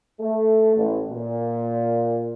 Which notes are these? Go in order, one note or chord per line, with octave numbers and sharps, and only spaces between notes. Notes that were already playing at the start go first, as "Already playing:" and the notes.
A3
A1
A#2